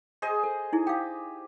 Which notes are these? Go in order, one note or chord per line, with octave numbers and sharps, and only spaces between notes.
G#4 C5 D#5
A4
D#4 E4 G#4
G4 F5 G5